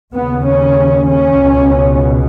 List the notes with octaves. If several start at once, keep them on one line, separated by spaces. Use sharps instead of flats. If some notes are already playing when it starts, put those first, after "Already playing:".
D#2 C#3 B3
C#4
C#4
C#2 B2